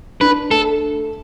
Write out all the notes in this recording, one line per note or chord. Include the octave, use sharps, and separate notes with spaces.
D4 B4
A3 A4